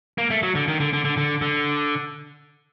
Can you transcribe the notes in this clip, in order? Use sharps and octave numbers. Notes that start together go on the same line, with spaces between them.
A#3
A3
F#3
D3
D#3
D3
D3
D3
D3
D3